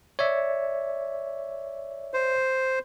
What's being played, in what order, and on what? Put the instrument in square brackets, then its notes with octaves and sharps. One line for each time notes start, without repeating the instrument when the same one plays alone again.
[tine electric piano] C#5 D5 E5
[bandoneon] C5